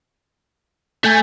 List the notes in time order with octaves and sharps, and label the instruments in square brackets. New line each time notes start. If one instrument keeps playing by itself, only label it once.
[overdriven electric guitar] A3 [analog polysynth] G#5 G6